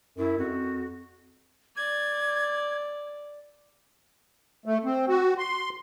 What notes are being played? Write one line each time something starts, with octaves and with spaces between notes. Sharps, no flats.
F#2 E4
F2 F#4
D5 G#6
A3
C4
F#4
C6